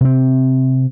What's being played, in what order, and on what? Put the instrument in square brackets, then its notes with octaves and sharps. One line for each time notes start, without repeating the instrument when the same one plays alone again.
[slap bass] C3 C4